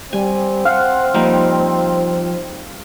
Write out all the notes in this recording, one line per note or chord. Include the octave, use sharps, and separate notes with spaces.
G3 C4 G#5
F5 F#5
F3 G3 A#3 D#4